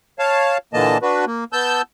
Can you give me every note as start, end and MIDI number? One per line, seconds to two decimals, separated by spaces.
0.19 0.58 73
0.19 0.58 77
0.19 0.58 81
0.74 0.98 46
0.74 0.98 50
0.74 0.98 52
0.74 0.98 58
0.74 0.98 75
0.74 0.98 81
1.02 1.25 62
1.02 1.25 66
1.02 1.25 71
1.27 1.44 58
1.53 1.82 59
1.53 1.82 81
1.53 1.82 88
1.53 1.82 91